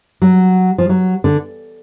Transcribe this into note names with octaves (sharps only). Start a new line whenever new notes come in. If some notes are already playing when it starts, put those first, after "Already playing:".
F#3
F3
F#3
D3